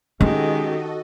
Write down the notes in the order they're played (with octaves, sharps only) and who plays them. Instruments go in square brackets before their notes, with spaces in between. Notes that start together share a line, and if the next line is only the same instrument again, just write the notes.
[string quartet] D#3 G4 [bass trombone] G#3 [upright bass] C#4 [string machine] F#4 A4 D#5